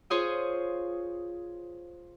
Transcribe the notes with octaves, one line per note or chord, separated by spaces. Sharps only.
F4 G#4 C5 C#5 C6 D#6